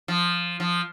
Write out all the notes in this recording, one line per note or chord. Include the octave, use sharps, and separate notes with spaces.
F3
F3